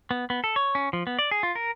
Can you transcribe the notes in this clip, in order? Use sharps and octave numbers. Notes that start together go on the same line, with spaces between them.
B3
B3
A4
C#5
C#4
F3
B3
D5
G#4
F4
A#4